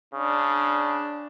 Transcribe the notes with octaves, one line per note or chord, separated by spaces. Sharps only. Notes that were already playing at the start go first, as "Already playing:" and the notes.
C#3 D4